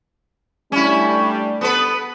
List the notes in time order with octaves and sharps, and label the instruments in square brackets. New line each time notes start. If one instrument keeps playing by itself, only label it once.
[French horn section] G3 A3 D4 [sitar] C#4 E4
[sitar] B3 A4 B4